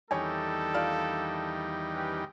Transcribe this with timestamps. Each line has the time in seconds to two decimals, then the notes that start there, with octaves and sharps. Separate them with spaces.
0.11 E2 D#3 G3 A3 D4 A4 C#5 G#5
0.74 F4 D5 F6
1.93 C#4 G4 B4